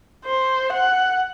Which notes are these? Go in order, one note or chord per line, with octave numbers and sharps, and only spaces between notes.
C5
F#5